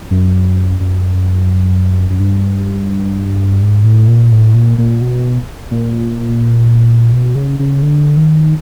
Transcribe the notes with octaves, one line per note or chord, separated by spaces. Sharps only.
F#2
F#2
F#2
G2
G#2
A2
A#2
A2
A#2
A#2
B2
A#2
B2
C#3
C#3
D3
D#3